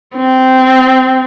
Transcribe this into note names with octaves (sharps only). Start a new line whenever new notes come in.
C4